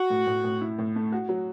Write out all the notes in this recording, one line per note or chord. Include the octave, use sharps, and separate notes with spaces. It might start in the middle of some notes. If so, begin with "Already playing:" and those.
Already playing: F#4
A2
A2
A2
E4
A2
A3
F#4
F#3